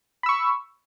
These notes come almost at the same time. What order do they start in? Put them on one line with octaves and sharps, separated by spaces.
B5 E6 C#6